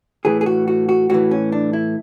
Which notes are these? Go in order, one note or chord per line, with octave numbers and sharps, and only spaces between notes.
A2 E3 G#4
G#4
F#4
F#4
F#4
A2 E3 F#4
C#4
D4
E4